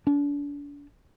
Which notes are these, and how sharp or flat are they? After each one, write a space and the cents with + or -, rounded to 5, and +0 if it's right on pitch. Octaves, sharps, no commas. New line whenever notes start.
D4 -35